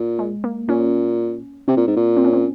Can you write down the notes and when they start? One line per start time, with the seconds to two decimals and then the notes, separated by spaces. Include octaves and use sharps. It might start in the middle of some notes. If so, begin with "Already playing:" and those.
Already playing: A#2
0.19 G#3
0.44 A#3
0.69 A#2 C#4
1.68 C3 C4
1.77 A#2
1.87 G#2
1.96 A#2
2.17 C4
2.24 C#4
2.33 C4